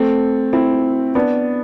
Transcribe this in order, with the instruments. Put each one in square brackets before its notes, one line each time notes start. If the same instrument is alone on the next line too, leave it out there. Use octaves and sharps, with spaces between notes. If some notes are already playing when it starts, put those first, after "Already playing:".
Already playing: [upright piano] A3 C4
C4 E4
B3 D4